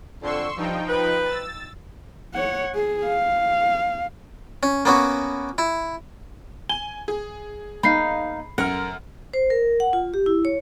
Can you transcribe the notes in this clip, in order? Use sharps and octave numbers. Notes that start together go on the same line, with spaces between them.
F2 D3 C6 C#6 E6
G2 F3 D#4 G5
B4
E6 A6
C#5 F#5
G#4
F5
C#4
A#3 B3 C#4 F#4
E4
G#5 G7
G#4
A#3 D#4 F5 B5 C7
F#2 A#4 F#5 F6
C5
A#4
F#5
F4
G4
E4
C#5